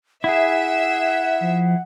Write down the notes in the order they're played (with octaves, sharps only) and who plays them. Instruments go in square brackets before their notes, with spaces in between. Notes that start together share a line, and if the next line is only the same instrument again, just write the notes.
[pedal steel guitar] E4 G#4 [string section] E5 [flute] F#5
[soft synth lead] F3